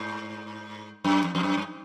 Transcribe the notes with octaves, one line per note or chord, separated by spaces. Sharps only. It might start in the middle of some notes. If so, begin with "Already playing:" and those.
Already playing: G#2
F#2
F2
F2
F#2
G2